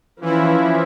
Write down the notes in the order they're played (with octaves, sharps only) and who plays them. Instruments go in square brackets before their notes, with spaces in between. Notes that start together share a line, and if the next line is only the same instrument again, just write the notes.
[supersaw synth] E3 E4 [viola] F3 C#4